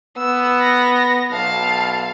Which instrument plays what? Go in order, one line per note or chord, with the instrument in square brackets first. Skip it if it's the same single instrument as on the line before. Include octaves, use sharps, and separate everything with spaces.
[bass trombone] B3 [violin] E6
[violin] A#6
[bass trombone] B1 [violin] F5 A5